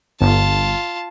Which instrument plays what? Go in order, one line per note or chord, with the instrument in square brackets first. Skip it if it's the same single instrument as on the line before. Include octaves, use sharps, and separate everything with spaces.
[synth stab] G1 [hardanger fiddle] F4 A5